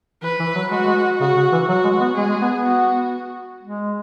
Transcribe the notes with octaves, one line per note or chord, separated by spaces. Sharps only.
E3 B4
E3
F#3
G#3 F#4
G#3
C#3 F#4
C#3
E3
F#3 F#4
G#3
B3
G#3 G#4
G#3
B3
B3
F#4
G#3